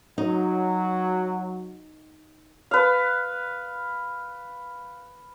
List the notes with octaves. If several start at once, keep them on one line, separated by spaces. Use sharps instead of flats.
F#3 D#4
B4 F5